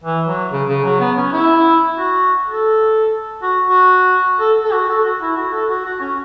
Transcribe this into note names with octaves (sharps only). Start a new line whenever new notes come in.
E3
F#3
C#3
C#3
F#3
B3
C#4
E4
F#4
A4
F#4
F#4
A4
A4
F#4
A4
F#4
E4
F#4
A4
F#4
F#4
C#4